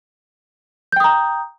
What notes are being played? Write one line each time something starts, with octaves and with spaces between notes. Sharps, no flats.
G5 A#5 D#6 G6